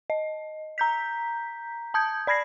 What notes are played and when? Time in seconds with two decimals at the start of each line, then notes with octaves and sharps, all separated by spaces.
0.10 D#5
0.78 A#5 G6 B6
1.94 A5 D#6 G6 G#6
2.27 D5 B5 G#6 A#6 C7